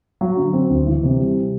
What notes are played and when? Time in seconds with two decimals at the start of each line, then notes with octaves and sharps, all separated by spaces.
0.21 F#3
0.37 D3
0.53 C4
0.70 D2
0.86 E3
1.03 C3
1.19 G3